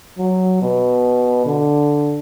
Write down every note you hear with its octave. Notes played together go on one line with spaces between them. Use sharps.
F#3
B2
D3